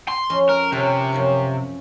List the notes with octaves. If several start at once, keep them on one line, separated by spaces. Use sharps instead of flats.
C6
F2 C#4
A#4
C3 C#4 A4 A#4
F#2 F3 C#4